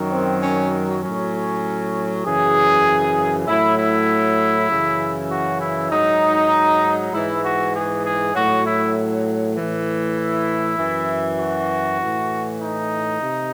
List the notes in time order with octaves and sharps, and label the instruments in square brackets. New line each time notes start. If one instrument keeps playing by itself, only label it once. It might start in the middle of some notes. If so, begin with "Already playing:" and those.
Already playing: [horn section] F#2 D#3 F#3
C4
C#4
A2 F#3 C#4
F#2 C#3 E3 G#4
A2 F#3 E4
E4
F#2 C#3 E3
F#4
E4
G#2 F#3 D#4
G#2 E3 E4
F#4
G#4
G#4
A2 F#3 F#4
E4
A2 E3
E4
F#2 E3
F#4
A2 E3
D#4
C3